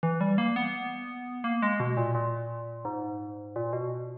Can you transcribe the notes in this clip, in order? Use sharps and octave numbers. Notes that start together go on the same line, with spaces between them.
E3
G3
A#3
B3
A#3
G#3
B2
A#2
A#2
G#2
A#2
B2